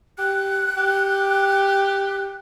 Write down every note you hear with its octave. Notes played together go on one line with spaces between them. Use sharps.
G4 F#6
G4